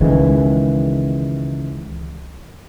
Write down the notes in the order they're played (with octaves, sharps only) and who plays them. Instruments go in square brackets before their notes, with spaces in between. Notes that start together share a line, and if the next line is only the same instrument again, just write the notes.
[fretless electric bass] C#2 D#3 E3 G#3